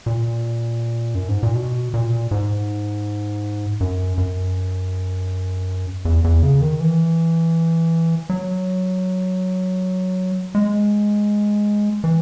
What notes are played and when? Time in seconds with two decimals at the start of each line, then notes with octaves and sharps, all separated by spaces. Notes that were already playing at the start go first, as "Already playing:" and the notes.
0.06 A#2
1.15 F#2
1.28 G#2
1.43 A#2
1.55 B2
1.94 A#2
2.31 G#2
3.80 F#2
4.18 F#2
6.05 E2
6.24 E2
6.43 C#3
6.61 D#3
6.80 E3
8.30 F#3
10.55 G#3
12.04 E3